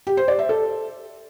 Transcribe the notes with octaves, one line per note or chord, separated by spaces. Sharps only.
G4
C5
D5
E5
A4